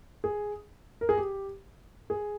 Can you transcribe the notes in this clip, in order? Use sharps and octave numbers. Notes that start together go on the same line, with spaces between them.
G#4
A#4
G#4
G4
G#4